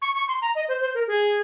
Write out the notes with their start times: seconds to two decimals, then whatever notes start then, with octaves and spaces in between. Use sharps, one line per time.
0.02 C#6
0.16 C#6
0.28 C6
0.42 A#5
0.55 D#5
0.68 C5
0.81 C5
0.95 A#4
1.07 G#4